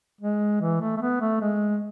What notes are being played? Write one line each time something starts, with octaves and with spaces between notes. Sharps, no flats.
G#3
E3
A3
A3
B3
A3
G#3